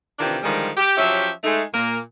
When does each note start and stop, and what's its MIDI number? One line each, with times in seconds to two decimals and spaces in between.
0.19 0.38 48
0.19 0.38 51
0.19 0.38 52
0.19 0.38 62
0.19 0.38 65
0.19 0.38 67
0.43 0.70 50
0.43 0.70 51
0.43 0.70 53
0.43 0.70 55
0.43 0.70 56
0.77 0.93 67
0.98 1.30 53
0.98 1.30 54
0.98 1.30 61
0.98 1.30 67
0.98 1.30 76
1.44 1.62 56
1.44 1.62 57
1.44 1.62 63
1.74 1.99 46
1.74 1.99 58